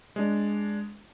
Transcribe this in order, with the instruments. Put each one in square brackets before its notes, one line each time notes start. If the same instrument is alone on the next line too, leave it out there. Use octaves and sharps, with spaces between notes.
[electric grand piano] G#3 D4